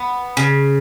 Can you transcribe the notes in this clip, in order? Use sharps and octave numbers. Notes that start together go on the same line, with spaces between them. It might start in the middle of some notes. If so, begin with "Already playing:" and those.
Already playing: B3
C#3